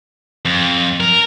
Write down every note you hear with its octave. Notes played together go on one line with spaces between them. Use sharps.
F2
A#4